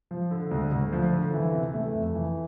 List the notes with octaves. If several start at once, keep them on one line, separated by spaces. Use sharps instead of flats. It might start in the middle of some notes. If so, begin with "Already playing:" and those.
F3
D3
D2
D2
F3
D3
E3
C3
A3
F2
E3